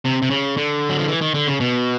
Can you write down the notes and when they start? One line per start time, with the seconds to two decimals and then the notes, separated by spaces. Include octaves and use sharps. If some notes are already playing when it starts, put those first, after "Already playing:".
0.05 C3
0.22 C3
0.30 C#3
0.57 D3
0.89 F#3
0.99 F3
1.08 E3
1.21 D#3
1.34 D3
1.47 C#3
1.60 B2